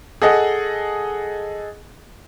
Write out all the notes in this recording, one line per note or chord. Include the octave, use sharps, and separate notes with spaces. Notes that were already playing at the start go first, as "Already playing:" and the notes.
G#4 A4 D#5 F#5